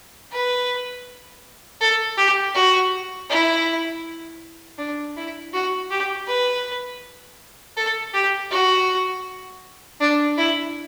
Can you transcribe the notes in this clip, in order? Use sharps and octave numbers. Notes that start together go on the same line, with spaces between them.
B4
A4
G4
F#4
E4
D4
E4
F#4
G4
B4
A4
G4
F#4
D4
E4